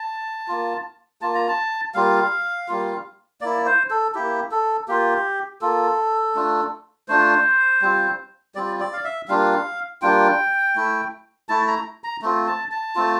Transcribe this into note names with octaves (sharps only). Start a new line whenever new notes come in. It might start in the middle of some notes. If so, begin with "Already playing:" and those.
Already playing: A5
A#3 F4
A#3 F4 A5
A#5
A5
G3 A#3 F4 F5
G3 A#3 F4
A#3 E4 D5
C5
A4
A#3 E4 G4
A4
A#3 F4 G4
A#3 F4 A4
A3 D4 F4
A3 D4 F4 C5
G3 C4 F4
G3 C4 F4 D5
D5
F5
E5
G3 A#3 D4 F4 F5
G3 A#3 D4 F4 G5
A3 E4
A3 E4 A5
A#5
A#5
A3 C4 F4
A5
A5
A3 C4 F4